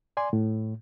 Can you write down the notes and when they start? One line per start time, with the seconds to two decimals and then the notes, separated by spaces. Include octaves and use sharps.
0.17 D5 G#5 C6
0.33 A2